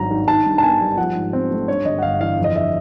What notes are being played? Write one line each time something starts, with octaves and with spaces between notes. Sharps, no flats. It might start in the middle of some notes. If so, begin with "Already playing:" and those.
Already playing: G#1 G2 F#3 A#5
D#3
D#3 A5
G2
A5
B3 G#5
G3
F3 F#5
G#2
C4
A3
G2 C#5
G1 D#5
F#5
G1 F5
E3 F5
F2
D#5
E5